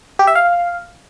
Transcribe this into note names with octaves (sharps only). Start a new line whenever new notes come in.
G4
E5
F5